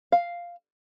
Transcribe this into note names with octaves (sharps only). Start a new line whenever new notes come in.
F5